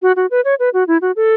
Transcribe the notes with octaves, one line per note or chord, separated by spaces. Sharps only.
F#4
F#4
B4
C#5
B4
F#4
E4
F#4
A4